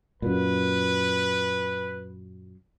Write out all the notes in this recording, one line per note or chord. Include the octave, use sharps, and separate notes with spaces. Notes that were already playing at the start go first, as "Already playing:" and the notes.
F#2 A#2 B4